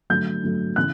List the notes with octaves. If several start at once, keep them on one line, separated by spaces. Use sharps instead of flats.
D3 F#3 A3 G6
D3 F#3 A3
C#3 E3 F#6